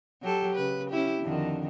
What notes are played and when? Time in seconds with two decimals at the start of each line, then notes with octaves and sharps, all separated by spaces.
0.22 F#3 G4 A4
0.55 C#3 B4
0.90 C#4 E4 G4
1.23 F2 D3 D#3